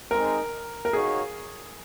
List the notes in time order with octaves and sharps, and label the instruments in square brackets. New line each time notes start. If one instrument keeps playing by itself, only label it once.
[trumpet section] G#3 C4 D#4 G#4 [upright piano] A#4
[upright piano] A#4
[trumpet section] D#4 F#4 C#5 F5 [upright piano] G#4